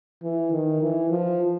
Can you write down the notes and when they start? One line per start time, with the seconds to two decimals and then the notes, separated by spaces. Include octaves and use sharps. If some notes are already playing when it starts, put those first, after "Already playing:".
0.23 E3
0.52 D#3
0.82 E3
1.10 F3